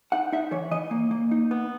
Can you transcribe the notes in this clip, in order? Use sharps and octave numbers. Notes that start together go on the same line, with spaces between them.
D#4 F#5
D#4 E5
E3 C#5
E3 D#5
A#3
A#3
D#4
B3